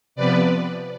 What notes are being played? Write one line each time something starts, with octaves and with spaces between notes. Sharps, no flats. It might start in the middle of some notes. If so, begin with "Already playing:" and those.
C3 F3 B3 B4 D5